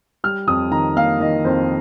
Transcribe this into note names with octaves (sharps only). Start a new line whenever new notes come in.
G3 F6
F2 D#6
D#3 A#5
A#3 F5
D#3 D#5
F2 C5